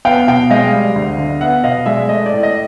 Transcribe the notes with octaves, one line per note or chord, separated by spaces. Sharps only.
B3 F5 G5
B2 F5 G5
G#3 D#5 F5
G3
D2
D3
B3 E5 F#5
B2 D#5 F5
G#3 D5 E5
A3 D#5
D5
A2
D#5